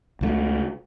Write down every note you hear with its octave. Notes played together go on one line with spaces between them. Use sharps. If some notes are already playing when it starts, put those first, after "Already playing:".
C#2 F3 A3